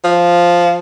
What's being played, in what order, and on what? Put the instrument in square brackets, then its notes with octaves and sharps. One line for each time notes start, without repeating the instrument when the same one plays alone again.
[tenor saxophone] F3